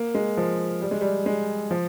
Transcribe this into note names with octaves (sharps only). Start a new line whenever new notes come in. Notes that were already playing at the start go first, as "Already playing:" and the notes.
Already playing: A#3
G#3
F3
G3
G#3
G3
G#3
F3